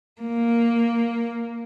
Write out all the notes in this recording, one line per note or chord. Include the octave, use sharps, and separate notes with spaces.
A#3